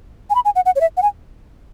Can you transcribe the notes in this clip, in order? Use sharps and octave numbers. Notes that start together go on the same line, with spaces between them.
G#5
B5
G#5
F#5
F#5
C#5
E5
F#5
G#5